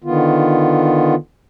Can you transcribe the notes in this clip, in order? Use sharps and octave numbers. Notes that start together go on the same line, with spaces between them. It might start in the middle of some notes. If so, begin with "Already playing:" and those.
D3 D#3 B3 F4